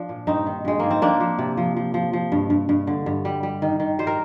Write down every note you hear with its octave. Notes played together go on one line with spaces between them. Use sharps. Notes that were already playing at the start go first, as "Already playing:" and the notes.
Already playing: F3 D4
A#2
G2 C4 D#4
D#3
G2 G#3
D#3 A#3
C4
F3 A#3 D4
F3
C3
F3
F3
F3
F3
G2
G2
G2
D3
G2
G3
G3
D#3
D#3
G3 C5
A#4